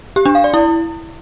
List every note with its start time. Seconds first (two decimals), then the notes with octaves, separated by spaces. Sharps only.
0.16 G4
0.26 D4
0.35 F5
0.44 D5
0.54 E4